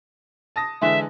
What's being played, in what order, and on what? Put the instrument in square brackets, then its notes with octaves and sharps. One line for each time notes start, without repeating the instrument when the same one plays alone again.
[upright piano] A5 D#6 A#6
[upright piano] D3 E3 G#3 [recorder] E5